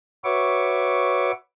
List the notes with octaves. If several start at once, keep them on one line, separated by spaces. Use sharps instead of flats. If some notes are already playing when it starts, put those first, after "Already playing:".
F#4 B4 C#5 E5 C#6 D6